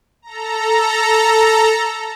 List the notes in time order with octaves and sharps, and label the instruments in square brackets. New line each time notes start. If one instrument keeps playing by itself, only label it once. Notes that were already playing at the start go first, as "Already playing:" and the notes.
[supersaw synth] A4 A#5